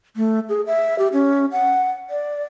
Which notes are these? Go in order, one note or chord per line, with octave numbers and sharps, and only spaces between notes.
A3
G#4
E5
G4
C#4
F#5
D5